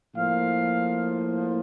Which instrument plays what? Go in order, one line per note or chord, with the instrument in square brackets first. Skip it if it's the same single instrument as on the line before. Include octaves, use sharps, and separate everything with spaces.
[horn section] A2 F3 A#3 F5